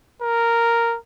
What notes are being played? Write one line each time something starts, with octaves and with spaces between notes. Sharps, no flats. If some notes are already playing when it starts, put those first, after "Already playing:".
A#4